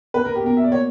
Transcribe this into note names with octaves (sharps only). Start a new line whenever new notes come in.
A#3 B4
A#4
G4
B2 A#4
E5
D5
A#3 C#5